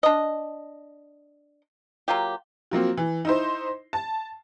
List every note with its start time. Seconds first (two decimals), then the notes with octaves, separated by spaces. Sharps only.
0.03 D4 D#5
2.08 F#3 A#3 F4 G4
2.71 F3 F#3 A#3 C4
2.97 E3
3.25 D#4 E4 C5
3.93 A5